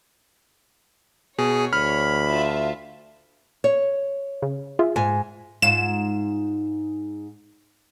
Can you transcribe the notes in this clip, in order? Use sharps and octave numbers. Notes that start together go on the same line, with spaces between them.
B2 G#4 C#5
D2 B5 F6
F4 E5 A5
C#5
C#3
F4 G#4 E5
G#2 G#5
G#2 F4 E7